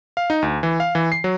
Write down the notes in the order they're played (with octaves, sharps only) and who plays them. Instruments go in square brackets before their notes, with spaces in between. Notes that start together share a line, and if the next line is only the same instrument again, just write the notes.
[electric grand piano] F5
D#4
D2
E3
F5
E3
C7
F#3